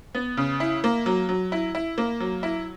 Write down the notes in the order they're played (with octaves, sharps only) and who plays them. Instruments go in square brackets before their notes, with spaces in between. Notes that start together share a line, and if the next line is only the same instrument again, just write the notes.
[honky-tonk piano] B3
C#3
E4
A#3
F#3
F#3
E4
E4
A#3
F#3
E4